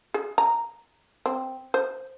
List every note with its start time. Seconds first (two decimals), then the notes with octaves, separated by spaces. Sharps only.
0.14 G#4
0.38 A#5
1.26 C4
1.74 C5